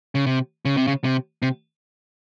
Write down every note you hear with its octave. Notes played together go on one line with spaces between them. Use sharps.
C#3
C3
C#3
C3
C#3
C3
C3